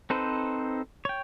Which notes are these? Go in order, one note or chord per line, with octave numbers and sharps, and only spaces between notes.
C4 D#4 A4 B4 C5
C#5 G5